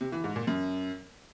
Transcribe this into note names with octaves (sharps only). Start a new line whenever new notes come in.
C3
E3
G#2
A#2
F#2